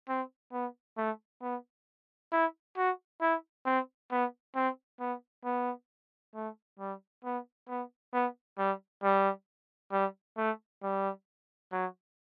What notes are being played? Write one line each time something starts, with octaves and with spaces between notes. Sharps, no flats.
C4
B3
A3
B3
E4
F#4
E4
C4
B3
C4
B3
B3
A3
G3
B3
B3
B3
G3
G3
G3
A3
G3
F#3